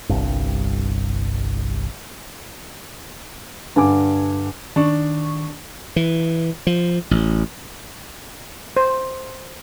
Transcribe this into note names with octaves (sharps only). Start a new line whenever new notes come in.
G1 C2 G2
G2 D3 G#5 D6
D#3 D4 C#6
E3
F3
A1
C5